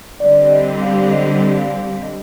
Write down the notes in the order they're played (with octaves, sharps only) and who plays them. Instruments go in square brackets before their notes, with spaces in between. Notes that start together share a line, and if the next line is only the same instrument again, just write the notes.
[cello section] D3 G3 C4 G4 [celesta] D5
[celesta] D5
D#5
F5
D#5
F5
D#5